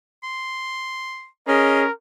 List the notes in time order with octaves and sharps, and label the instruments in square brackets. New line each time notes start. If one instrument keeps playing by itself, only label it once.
[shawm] C6
[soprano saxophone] C#4 [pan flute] G#4 [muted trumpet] A#4 [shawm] D#5